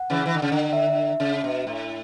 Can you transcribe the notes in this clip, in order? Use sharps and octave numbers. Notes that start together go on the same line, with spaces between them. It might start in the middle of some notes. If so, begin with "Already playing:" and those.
Already playing: F#5
C#3 E3
E3
D3
C#3
D3
E5
C#3
B2
A2